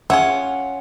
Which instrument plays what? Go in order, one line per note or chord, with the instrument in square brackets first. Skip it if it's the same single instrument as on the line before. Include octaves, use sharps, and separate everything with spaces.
[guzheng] C#4 F4 [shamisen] G#4 C#5 E5 [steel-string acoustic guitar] F#5